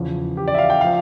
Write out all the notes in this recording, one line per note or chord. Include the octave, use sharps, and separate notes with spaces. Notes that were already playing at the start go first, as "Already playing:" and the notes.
Already playing: E2 C#3 F3
G4
D5
E5
F5
G5
F3 F5